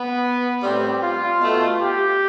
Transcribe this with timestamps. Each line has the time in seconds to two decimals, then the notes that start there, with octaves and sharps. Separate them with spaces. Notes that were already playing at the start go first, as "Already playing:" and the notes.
Already playing: B3
0.63 A2 G3 C4
1.02 F4
1.41 B2 A3
1.80 G4